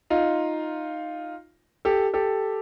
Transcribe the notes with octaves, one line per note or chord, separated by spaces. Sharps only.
D#4 F4
G4 A4
G4 A4